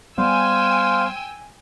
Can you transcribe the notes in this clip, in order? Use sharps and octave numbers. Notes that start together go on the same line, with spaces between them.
G3 B3 C5 F5 G5 G#5 E6